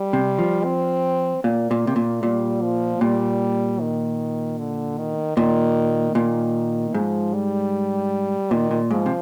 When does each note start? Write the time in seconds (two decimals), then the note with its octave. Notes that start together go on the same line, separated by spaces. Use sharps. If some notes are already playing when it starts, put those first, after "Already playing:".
Already playing: G3
0.13 C3
0.39 F3
0.65 C4
1.44 A#2 A#3
1.71 A#2
1.87 C3
1.96 A#2
2.23 A#2 G3
2.62 F3
3.01 A#2 G3
3.80 D#3
4.58 D3
4.98 D#3
5.37 A#2 D#3
6.15 A#2 D#3
6.94 G#2 F3
7.34 G3
8.51 A#2 D#3
8.71 A#2
8.91 G#2 F3
9.06 C3